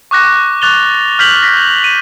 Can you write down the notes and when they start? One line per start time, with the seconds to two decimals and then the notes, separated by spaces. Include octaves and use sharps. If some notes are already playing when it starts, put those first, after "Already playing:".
0.11 C#6 D6 F#6 A#6
0.62 C#6 D6 F#6 A6 F7 G7
1.19 F6 G6 B6 F7 F#7
1.42 A#6 B6
1.84 D#7